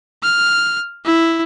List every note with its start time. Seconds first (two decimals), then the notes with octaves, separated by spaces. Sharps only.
0.23 F6
1.05 E4